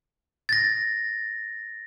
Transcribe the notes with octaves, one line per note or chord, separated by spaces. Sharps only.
A6 A#6